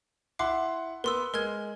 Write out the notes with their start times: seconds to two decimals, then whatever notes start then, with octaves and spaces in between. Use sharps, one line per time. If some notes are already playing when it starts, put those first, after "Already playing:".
0.39 E4 F#5 C6 D6 C7
1.04 B3 A#4 C6 E6
1.34 G#3 A#4 F6 G#6